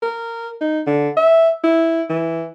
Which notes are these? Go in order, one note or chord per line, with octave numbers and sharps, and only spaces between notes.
A#4
D#4
D3
E5
E4
E3